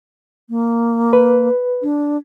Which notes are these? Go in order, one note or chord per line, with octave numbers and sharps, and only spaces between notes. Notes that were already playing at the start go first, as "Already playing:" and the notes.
A#3
B4
D4